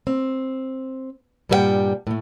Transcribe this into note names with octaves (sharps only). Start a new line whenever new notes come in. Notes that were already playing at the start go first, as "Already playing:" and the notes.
C4
G2 A#2 G3 A4 F#5 G5
A2 A3